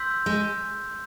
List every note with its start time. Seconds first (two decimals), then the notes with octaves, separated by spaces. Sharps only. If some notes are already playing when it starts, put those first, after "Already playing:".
Already playing: C6 E6 G6 B6
0.26 G#3